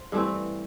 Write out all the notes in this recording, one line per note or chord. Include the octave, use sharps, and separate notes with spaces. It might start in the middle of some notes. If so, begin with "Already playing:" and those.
Already playing: C5
G2 E3 A3 C4